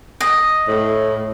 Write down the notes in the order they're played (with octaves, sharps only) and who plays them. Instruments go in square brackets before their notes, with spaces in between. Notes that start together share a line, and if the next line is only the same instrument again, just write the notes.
[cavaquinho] D#5
[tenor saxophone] A2